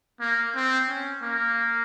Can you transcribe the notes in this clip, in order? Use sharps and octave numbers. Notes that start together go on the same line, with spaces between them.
A#3
C4
C#4
A#3